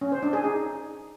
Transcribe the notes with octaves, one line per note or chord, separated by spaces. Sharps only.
C#4
C5
D4
G#4
D#4